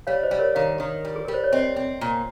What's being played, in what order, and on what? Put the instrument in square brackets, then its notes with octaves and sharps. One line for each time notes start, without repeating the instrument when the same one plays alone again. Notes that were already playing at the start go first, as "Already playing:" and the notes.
[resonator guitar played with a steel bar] G3 [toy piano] C#5 F5
[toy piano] C5 D#5
[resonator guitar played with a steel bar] G3
[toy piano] A#4 C#5
[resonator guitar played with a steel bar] D#3 [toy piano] C#5 F5
[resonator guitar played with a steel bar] D#3
G3
[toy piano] G#4
[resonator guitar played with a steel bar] G3 [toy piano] A#4
[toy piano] C5
C#5
[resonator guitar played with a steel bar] C4 [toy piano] C5 D#5
[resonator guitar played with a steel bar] C4
A#2